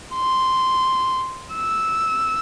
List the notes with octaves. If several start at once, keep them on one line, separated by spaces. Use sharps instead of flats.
C6
E6